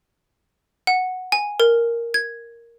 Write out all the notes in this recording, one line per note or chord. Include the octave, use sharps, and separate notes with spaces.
F#5
G#5
A#4
G#6